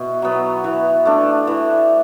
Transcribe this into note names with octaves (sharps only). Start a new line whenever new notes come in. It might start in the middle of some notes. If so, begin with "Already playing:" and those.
Already playing: B2 E4 F#4
F#3 B3
E3
A3 D4
E3